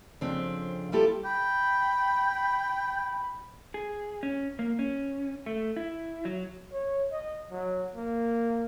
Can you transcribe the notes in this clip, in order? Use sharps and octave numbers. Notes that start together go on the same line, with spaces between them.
F2 C#3 C4 D4
G3 E4 F4 G4 A4
G5 B5
G#4
C#4
A#3
C#4
A3
E4
F#3
C#5
D#5
F#3
A#3